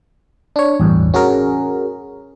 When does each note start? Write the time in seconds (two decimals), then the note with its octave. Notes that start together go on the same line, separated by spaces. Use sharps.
0.56 D4 C#5
0.80 A1 E2 G2
1.14 C#4 F#4 G#4 A#4